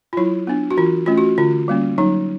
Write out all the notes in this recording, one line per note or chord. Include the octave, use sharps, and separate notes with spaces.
F4
F#3 E4
B3 D4
F#4
E3 F4
A3 C#4 F4
F#4
D3 F4
G3 A#3 C#4
F#3 D#4